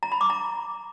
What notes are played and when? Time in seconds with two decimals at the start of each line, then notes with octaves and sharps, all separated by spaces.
0.03 A#5
0.12 B5
0.21 D6
0.30 A#5